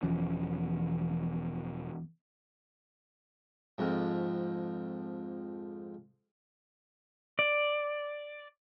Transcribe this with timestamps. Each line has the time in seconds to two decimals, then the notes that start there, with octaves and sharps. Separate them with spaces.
0.03 E1 E2 F3 C#4
3.78 F2 G#2
7.39 D5